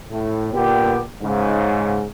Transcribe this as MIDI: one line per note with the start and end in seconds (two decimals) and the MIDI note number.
0.10 0.49 45
0.53 0.99 46
0.53 0.99 50
0.53 0.99 59
0.53 0.99 67
1.22 2.06 44
1.22 2.06 49